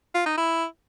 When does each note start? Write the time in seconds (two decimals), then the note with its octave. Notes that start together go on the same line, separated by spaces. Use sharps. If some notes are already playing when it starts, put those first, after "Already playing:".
0.14 F4
0.26 D#4
0.37 E4